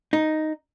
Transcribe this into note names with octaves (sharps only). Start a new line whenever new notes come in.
D#4